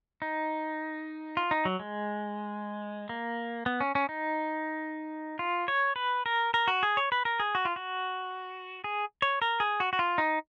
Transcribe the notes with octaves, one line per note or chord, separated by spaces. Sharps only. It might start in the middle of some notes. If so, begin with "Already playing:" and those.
D#4
F4
D#4
F#3
G#3
A#3
B3
C#4
C#4
D#4
F4
C#5
B4
A#4
A#4
F#4
G#4
C#5
B4
A#4
G#4
F#4
F4
F#4
G#4
C#5
A#4
G#4
F#4
F#4
F4
D#4